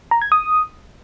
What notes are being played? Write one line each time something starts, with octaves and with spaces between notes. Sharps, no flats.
A#5
G#6
D#6